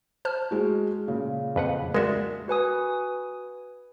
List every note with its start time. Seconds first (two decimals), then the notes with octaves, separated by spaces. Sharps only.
0.25 C5 A5 F6
0.51 G#3 F#4
1.07 A#2 C#3
1.56 F2 B4 F#5
1.94 G#3 F#4 A#4 D5 E5
2.48 F#4 B4 G#5 D#6